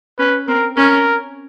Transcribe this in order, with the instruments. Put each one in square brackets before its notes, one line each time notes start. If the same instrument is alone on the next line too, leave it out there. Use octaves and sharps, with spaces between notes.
[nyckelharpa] C#4 [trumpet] B4
[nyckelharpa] C4 [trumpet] A#4
[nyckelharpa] C#4 [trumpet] A#4